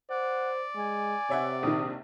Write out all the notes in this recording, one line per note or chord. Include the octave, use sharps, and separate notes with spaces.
C5 D5 F#5
G#3 G#5
C3 C#5 E5 F#5
A#1 D#3 D#6